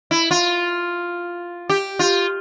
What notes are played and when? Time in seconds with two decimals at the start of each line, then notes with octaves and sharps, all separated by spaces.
0.11 E4
0.31 F4
1.69 G4
1.99 F4